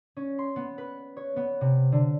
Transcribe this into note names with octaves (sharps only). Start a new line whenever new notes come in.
C#4
C6
B3
B4
C#5
B3
C3
D3